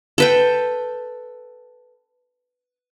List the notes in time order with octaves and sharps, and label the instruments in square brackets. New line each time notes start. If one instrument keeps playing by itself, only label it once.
[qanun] A4 B4 G5